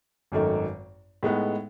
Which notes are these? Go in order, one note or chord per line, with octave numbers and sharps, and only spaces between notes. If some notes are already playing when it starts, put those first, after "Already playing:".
G#1 F#2 D#3 A3 D#4
A2 G#3 B3 D#4